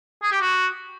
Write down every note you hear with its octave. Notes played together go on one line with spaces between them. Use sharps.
G#4
G4
F#4